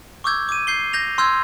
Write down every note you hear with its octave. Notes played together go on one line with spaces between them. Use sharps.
C#6 D6 E6 G6 G#6
D6 D#7
G6 C7 G7
G6 A#6 F7
C6 E6 F6 G6 G#6